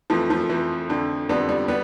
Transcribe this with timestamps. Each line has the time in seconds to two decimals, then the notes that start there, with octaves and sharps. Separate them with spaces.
0.10 F2 E3 F3 A3
0.30 F3 A3
0.49 F2 E3
0.90 F2 D3
1.29 F2 D3 G3 B3
1.49 G3
1.68 G3 B3